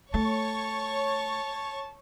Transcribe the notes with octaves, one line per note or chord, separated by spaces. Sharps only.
A3 C#5 A5 C#6